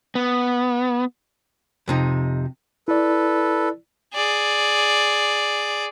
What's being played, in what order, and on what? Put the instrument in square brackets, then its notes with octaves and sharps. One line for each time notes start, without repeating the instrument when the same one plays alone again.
[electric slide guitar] B3
[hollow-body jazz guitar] F2 C3 D#4
[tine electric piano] E4 D5 [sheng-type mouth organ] A4 B4
[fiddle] G#4 D5